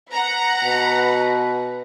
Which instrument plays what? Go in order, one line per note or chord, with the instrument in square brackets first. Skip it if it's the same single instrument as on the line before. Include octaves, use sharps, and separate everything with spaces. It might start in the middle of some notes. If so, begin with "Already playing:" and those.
[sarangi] B4 [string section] F#5 A#5
[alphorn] B2